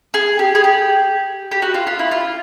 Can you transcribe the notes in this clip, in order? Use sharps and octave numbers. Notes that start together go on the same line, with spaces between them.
G#4
G4
G#4
G4
G4
F#4
F4
F4
E4
F4